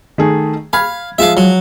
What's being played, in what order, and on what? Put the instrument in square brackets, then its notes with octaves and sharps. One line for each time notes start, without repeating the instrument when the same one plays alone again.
[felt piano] D#3 A3 G#4
[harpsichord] F5 [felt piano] B5 F6 G#6
[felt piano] F3 G#3 F4 [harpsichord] E5 F5
[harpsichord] F#3